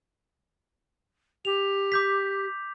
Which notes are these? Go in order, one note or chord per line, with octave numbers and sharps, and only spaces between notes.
G4 F7
D6 G6 B6